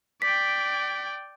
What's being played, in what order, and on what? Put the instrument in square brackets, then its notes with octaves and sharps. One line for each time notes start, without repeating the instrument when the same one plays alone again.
[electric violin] D5 G5 [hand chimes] B6